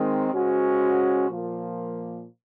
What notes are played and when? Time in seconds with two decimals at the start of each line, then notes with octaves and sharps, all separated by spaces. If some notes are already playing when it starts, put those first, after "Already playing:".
Already playing: D#3 G#3 C4
0.30 C#3 G#3 C#4 F#4 C5
1.28 A#2 F3 A#3